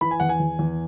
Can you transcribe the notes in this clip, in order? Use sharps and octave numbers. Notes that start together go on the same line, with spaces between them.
E3 B5
G#5
E2 F#5
G#5
E2
E2